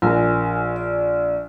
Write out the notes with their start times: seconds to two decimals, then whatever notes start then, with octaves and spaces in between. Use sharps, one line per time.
0.02 A#1 A#4 G#5
0.76 D5